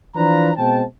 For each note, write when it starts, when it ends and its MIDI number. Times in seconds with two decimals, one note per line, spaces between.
0.16 0.51 52
0.16 0.51 53
0.16 0.51 62
0.16 0.51 65
0.16 0.51 71
0.16 0.51 82
0.57 0.83 47
0.57 0.83 56
0.57 0.83 60
0.57 0.83 79
0.57 0.83 81